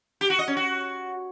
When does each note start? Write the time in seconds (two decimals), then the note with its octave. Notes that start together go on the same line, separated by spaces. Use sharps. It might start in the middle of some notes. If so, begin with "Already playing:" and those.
0.21 G4
0.30 F#4
0.39 D#5
0.48 C#4
0.57 F#4